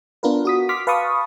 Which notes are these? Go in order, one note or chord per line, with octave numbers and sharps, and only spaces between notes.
B3 D4 F4 A#4 B4
F#4 D#6 B6
C6 D6 F6 B6
B4 F5 A5 B5 C#6 D#6